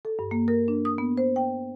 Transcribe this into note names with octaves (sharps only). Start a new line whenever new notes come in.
A4
G2
A#3
A#4
D4
D#6
B3
C5
G5